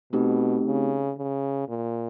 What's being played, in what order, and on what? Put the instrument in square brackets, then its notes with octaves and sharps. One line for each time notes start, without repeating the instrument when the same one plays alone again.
[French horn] B2 [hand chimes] A3 C4 D#4 G4
[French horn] C#3
C#3
A#2